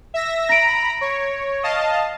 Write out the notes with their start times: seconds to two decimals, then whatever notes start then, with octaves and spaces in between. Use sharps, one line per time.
0.14 E5 E6 A#6
0.49 A#5 B5 A#6 D7
1.01 C#5
1.63 D#5 F5 A5